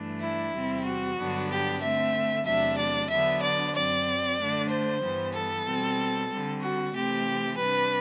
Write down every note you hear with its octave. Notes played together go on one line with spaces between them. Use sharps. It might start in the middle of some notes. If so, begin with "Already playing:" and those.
Already playing: G2 E3 A3 D4
E4
E2 C3 G3 C4
F#4
G2 D3 F#3 B3 D4
G4
D3 A3 C4 E5
E2 C3 F#3 A3 D4 E5
D5
D3 F#3 B3 D4 E5
D5
F#2 F#3 C4 D5
D3 A3 D4
C5
G2 E3 G3 B3
A4
B2 G3 C4
D3 G3 C4
F#4
C3 E3 A3 C4 G4
C3 G3 D4 B4